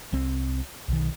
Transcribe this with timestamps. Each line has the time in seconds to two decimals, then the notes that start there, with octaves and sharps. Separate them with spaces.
0.13 C2 C4
0.88 B1 D#3